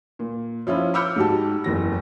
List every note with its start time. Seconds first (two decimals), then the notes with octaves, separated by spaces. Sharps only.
0.19 A#2
0.67 F3 C#4 E4 F4
0.94 B5 D6 E6 F6 G6 C#7
1.16 G#2 F#4 G4 A5
1.64 F#1 E2 A#6